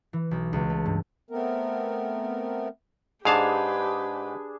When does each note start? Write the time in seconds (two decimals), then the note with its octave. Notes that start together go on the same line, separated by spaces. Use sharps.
0.13 E3
0.31 B1
0.53 C#2
0.70 A3
0.86 G2
1.30 A3 B3 C4 A#4
3.25 G#2 D4 G4 G#4 B4 F5 A5